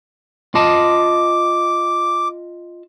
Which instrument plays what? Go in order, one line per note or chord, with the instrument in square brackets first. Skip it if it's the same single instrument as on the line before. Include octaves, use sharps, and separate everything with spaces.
[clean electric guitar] F4 D#5 A5 [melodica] D6